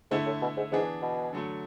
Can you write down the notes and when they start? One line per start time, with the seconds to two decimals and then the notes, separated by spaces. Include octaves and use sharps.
0.11 G#2 D3 A3 E4
0.26 A2
0.42 B2
0.57 G#2
0.72 G#2 E3 B3 D4 G#4
1.02 B2
1.33 D3 F#3 A3